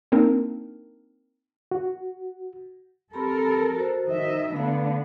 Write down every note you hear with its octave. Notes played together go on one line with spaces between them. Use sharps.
A#3 C4 D4 D#4 A#4
F#4
C4 G4 A4 A#4 B5
F#4 C5
D#3 D#5 E5
D3 A3 B3 D4 F5